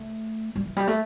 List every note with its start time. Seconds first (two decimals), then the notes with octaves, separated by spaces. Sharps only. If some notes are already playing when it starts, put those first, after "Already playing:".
Already playing: A3
0.56 G3
0.65 E3
0.77 G3
0.87 A3